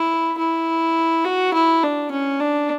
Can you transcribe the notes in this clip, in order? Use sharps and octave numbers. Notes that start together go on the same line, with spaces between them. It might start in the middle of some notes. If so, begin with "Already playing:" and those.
Already playing: E4
E4
F#4
E4
D4
C#4
D4